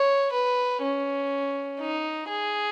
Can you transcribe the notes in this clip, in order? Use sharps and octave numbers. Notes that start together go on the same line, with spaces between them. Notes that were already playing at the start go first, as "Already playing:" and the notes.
Already playing: C#5
B4
C#4
D#4
G#4